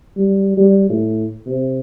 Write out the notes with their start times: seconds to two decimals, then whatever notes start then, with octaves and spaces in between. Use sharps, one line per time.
0.17 G3
0.57 G3
0.90 A2
1.46 C3